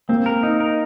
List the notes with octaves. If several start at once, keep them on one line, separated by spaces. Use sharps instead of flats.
A#3 C4
A#4
D#4
A#4